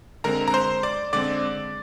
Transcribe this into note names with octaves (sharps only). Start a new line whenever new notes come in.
D3 G#3 C4 A#4 A#5
A#5
C5 C6
D5 D6
D3 G#3 C4 D5 D6